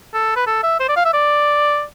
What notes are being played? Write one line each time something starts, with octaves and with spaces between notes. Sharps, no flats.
A4
B4
A4
E5
C5
D5
F5
E5
D5